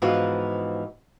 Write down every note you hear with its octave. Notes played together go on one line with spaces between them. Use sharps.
G#2 E3 F3 B3 F4 F#4